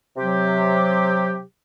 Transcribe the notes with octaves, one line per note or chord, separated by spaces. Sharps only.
C3 F#3 G4